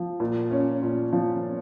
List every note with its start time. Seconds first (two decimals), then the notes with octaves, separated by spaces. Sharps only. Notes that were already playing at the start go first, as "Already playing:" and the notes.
Already playing: F3
0.20 A#2
0.51 C#4
0.83 A#2
1.12 F3